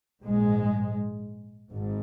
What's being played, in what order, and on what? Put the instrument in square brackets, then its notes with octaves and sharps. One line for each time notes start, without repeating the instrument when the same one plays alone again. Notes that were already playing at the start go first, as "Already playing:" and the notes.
[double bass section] A#1 G#2 G#3
G#1 G#2